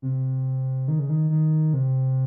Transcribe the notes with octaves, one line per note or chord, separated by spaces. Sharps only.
C3
D#3
C#3
D#3
D#3
C3